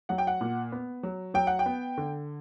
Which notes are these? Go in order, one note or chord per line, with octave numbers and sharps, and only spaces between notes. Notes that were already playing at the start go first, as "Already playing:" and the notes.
F#3 F#5
G5
F#5
A#2
B3
F#3
F#3 G5
F#5
G5
B3
D3